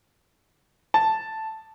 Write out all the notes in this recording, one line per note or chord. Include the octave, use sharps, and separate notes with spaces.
A5